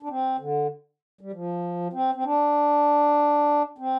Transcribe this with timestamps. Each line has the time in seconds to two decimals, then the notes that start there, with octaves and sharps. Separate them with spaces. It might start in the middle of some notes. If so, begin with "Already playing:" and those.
0.03 D4
0.09 C4
0.40 D3
1.21 G3
1.32 F3
1.93 C4
2.15 C4
2.24 D4
3.78 C4